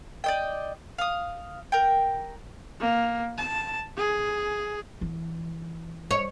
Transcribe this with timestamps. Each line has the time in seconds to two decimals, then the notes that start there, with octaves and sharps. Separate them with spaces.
0.24 D5 D#5 G5
0.98 F5 D#6
1.72 A#4 G5
2.80 A#3
3.38 A5
3.97 G#4
5.01 E3
6.11 C#5